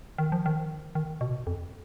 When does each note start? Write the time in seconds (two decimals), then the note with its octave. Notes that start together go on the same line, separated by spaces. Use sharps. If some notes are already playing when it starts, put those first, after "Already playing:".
0.18 D#3
0.32 F3
0.46 D#3
0.95 D#3
1.21 B2
1.47 F2